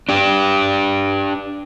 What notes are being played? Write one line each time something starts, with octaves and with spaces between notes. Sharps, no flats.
D4 G4